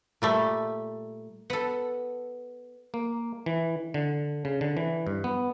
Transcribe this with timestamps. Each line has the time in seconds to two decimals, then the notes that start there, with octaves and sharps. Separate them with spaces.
0.22 A#2 G3 A3
1.50 B3 A4
2.94 A#3
3.46 E3
3.94 D3
4.45 C#3
4.61 D3
4.77 E3
5.07 G2
5.24 B3